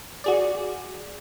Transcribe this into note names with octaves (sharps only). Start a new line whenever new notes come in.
F#4 G#4 D5